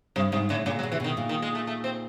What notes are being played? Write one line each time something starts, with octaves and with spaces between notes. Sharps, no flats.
G2 C3
G#2 C3
A2 C#3
A#2 C#3
F#3
B2
C3 E3
B2 D#3
A#2
D#3
G#3
A3
A3
C4